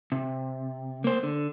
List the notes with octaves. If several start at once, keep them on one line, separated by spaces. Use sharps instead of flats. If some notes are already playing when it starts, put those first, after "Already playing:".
C3
A#3 C5
D3